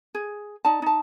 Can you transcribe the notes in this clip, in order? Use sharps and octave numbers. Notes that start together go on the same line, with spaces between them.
G#4
D#4 D5 A5
D#4 A5